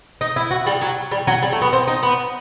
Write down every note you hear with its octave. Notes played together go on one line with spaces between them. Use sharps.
D#4
E4
F#4
G3
F#3
G3
F#3
G3
A3
B3
C4
D#4
B3